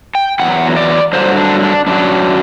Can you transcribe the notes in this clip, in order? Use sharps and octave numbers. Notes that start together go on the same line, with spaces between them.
G5
E2 C3 F#3 F#5
D5
G2 D3 F#3 C5
D4
D4
F#2 F#3 D4